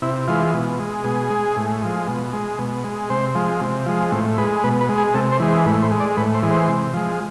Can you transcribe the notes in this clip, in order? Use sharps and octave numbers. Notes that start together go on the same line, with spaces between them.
C3 E4
E3 G#3 F4
B2
G#3
B2 G#4
G#3
A2
F3 G#3
B2
G#3
B2
G#3
C3 C5
F3 G#3
C3
F3 G#3
A2 C4
G#3 B4
B2 B4
B4
G#3
G#4
C3 A4
C5
E3 G#3
C5
A2 B4
C5
G#3
D5
A2 B4
C5
E3 G#3
C5
C3
F3 G#3